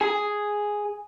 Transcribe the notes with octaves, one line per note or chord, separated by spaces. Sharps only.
G#4